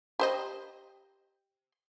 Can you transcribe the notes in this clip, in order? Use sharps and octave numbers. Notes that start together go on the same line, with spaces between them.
G4 C5 D#5